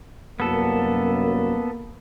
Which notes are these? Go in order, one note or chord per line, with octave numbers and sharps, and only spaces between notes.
C2 F#2 A#3 B3 A4